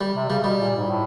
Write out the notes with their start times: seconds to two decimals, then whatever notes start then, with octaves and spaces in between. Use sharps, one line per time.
0.01 G3
0.16 C3
0.29 C#3 G3
0.43 B2 G3
0.59 A#2
0.77 G#2
0.87 A2